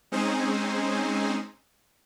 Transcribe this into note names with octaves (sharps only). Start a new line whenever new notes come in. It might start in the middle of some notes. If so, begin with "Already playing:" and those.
G#3 C4 C#4 D#4 G#4 C5